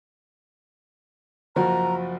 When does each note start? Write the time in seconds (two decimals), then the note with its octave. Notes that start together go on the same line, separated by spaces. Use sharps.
1.56 F#1 F3 F#4 A#5